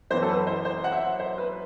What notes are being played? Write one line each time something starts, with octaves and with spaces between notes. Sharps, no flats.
F#2 E3 B3 C5
A4
B4
C5
C5
F#5
E5
C5
B4